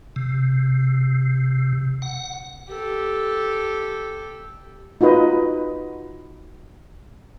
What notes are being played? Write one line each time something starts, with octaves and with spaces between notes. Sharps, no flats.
C3
F#5
G4 A4
D#4 F4 F#4 B4 D#5